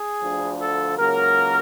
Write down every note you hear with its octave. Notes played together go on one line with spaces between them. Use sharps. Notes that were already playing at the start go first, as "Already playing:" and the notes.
Already playing: G#4
D2 D3 F3
A4
C#2 C#3 F#3 A#3 A#4